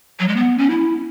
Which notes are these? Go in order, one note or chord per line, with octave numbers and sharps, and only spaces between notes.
F#3
G#3
B3
C#4
E4